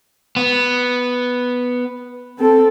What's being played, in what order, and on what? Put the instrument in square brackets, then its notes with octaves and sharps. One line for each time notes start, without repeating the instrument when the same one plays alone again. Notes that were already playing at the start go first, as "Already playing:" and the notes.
[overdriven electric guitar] B3
[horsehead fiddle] C4 A4